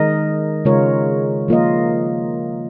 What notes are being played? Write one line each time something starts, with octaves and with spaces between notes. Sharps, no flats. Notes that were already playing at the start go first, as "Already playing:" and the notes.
Already playing: D#3 G#3 D#4 A#4 D#5
C#3 G#3 F4 A#4 C#5
F3 A#3 F4 A#4 D#5